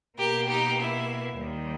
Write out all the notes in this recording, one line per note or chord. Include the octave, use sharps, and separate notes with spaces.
B2 A#3 G4 A#4
D#4 G4
E4
D#2 D#3 G3 A#3